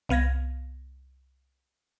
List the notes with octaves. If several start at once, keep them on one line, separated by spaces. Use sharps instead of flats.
C2 B3 F5 G#6 A#6